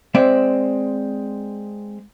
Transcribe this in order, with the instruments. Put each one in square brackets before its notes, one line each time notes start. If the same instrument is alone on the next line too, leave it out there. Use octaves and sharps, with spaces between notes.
[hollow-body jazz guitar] G#3 C4 D5 E5